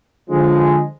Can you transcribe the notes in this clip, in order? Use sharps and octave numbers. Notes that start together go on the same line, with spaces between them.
D3 F3 G#3